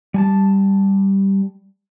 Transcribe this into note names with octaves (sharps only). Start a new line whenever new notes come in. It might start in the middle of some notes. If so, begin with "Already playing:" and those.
G3 G#5 A5